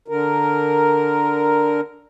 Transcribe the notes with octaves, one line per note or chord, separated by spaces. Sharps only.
D3 A#4